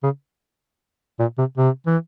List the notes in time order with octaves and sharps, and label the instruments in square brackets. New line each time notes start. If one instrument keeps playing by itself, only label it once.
[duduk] C#3
A#2
C3
C3
E3